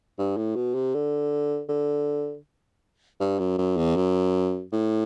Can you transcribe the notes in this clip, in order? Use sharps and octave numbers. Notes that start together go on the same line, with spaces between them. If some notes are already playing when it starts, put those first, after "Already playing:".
G2
A2
B2
C3
D3
D3
G2
F#2
F#2
E2
F#2
A2